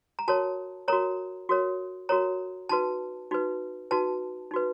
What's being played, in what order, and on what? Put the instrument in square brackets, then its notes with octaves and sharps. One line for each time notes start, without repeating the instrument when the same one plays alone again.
[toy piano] A#5
F#4 A#4 C#5 A5
F#4 A#4 C#5 A#5
F#4 A#4 C#5
F#4 A#4 C#5 A#5
D#4 F#4 B4 A5
D#4 F#4 B4
D#4 F#4 B4 A5
D#4 F#4 B4